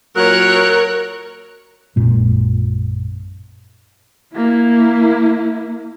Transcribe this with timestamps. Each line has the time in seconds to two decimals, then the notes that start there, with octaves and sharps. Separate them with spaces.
0.16 A#2 F#3 A#4 C#5 F#6
1.96 A#1 F#2 A#2 G#3
4.34 A#3 E4